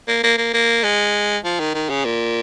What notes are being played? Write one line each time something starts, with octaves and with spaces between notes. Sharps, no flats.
A#3
A#3
A#3
A#3
G#3
F3
D#3
D#3
C#3
A#2